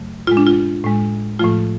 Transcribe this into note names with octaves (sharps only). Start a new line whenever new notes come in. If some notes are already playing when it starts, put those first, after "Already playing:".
Already playing: F#2 C#3 F#3 A3
A2 G#3 F4
D4
F4
A2 G#3
A2 F3 A3 F4